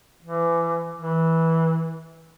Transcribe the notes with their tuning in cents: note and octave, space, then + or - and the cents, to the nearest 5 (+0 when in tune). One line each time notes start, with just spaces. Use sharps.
E3 +30
E3 -15